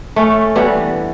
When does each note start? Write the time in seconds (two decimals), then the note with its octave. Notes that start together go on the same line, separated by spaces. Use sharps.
0.16 A3 C#4
0.55 E3 G3 B3 D4